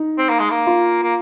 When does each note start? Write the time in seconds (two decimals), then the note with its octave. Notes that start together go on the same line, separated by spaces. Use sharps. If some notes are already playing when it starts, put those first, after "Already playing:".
Already playing: D#4
0.18 C4
0.29 A#3
0.40 G#3
0.51 A#3
0.67 F4
1.03 A#3